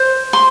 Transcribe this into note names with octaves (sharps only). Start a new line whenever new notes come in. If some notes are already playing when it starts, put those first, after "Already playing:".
Already playing: C5
C6